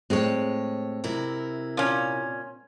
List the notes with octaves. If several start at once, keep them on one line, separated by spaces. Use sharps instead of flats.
A2 G#3 C4 C#5
C3 E4 A#4
A#2 C#4